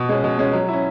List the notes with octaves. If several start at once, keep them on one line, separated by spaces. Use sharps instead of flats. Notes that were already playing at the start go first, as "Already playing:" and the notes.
Already playing: B2
G#3 C#4
B2
G#3 C#4
F#3
C#4 E4